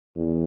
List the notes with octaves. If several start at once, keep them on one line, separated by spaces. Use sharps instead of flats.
E2